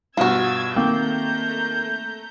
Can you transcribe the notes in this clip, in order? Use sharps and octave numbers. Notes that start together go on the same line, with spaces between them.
G2 B2 F4 F#4 E6 G#6 A6
D#3 A3 A#3 C4 A#5 G6